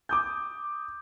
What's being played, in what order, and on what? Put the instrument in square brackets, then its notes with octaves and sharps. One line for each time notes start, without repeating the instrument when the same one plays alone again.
[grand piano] D6 D#6 G6